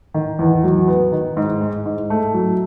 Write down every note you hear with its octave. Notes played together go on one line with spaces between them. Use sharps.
D#3
E2
F#3
B3
D#3
G#2
G#3
G#2
A3
F#3